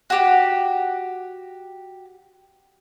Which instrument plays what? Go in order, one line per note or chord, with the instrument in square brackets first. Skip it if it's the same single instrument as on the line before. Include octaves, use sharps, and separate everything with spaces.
[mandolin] F#4 G4